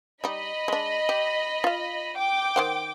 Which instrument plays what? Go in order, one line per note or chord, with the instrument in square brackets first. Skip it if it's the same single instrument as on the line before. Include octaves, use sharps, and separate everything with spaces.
[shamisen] G3 D#4 [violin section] D#5 B5
[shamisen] G#3 D4
G4
F4 F5
[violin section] G5 D6
[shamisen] D#3 C5 F#5